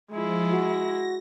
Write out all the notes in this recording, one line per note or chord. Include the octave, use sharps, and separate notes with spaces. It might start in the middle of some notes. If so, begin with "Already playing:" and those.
F3 G#3 E4 F4
F#4 A#6